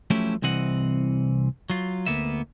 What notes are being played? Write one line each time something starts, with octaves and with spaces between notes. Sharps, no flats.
F3 F#3 A3 C#4 E4 G4
C2 C3 E3 C4 D#5 F#5
F#3 F4
D2 A#3 B3 E5